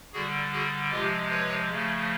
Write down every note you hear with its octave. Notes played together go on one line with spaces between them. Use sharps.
D3 G3 F#4 G#4
F#4 G#4
C3 F3 G#3 F4 G4
B4 C#5
C#3 F3 A3